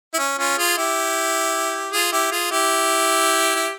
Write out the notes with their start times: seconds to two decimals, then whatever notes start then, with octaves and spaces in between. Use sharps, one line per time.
0.14 E4
0.19 C#4
0.39 C#4 F4
0.58 F4 G#4
0.78 E4 G4
1.93 F4 G#4
2.12 E4 G4
2.31 F4 G#4
2.51 E4 G4
3.56 E4